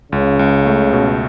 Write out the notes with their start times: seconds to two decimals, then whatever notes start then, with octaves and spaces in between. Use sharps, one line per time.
0.12 C#2 C#3
0.39 C#2
0.66 A3
0.93 B2